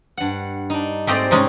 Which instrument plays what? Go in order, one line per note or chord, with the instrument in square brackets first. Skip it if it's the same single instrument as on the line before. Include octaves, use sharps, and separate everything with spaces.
[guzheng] G2 F#5
D4 D#4
[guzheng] G#2 C4 D5 [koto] A3 G4 D#5
[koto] C3 G#3 C#4 [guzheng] D#4